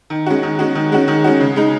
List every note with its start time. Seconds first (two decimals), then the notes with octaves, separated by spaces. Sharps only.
0.10 D#3
0.26 G#3 C#4 F#4
0.43 D#3
0.59 G#3 C#4 F#4
0.75 D#3
0.92 G#3 C#4 F#4
1.08 D#3
1.24 G#3 C#4 F#4
1.40 C#3
1.56 G#3 D#4